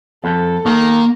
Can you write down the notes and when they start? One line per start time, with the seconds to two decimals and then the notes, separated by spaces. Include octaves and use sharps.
0.24 F2 A4
0.66 D#3 A#3